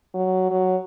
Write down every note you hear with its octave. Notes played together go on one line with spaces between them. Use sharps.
F#3
F#3